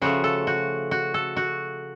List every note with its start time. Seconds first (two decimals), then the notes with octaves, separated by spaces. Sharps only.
0.02 C#3 F3 A3 F#4
0.24 A4
0.47 F#4
0.91 F#4
1.14 A4
1.36 F#4